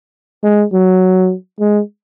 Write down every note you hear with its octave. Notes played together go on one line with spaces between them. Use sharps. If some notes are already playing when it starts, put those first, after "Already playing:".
G#3
F#3
G#3